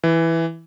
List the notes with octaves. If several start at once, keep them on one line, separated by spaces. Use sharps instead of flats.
E3